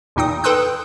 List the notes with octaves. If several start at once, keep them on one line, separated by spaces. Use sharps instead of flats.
E2 A#2 D#4 G5 D#6
A4 B4 G5 C6 D#6 F#6